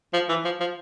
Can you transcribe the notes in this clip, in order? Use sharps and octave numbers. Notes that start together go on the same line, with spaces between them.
F3
E3
F3
F3